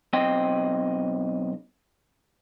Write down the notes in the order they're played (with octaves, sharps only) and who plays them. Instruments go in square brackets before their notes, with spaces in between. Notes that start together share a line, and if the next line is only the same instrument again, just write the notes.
[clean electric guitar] B1 C4 D#5 G5